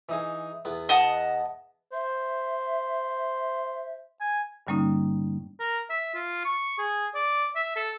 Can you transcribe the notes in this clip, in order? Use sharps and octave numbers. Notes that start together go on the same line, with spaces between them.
E3 D#4 G#4
E2 B3
D#5 F#5 A5
C5 E5
G#5
G2 D3 G3 A#3 C#4 D#4
A#4
E5
F4
C#6
G#4
D5
E5
A4